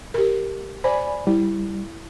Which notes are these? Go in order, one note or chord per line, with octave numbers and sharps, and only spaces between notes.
G4 A#4
C5 D5 G#5 B5
G3 E4